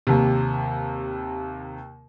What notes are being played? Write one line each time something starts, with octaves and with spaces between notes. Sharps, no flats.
D#2 C3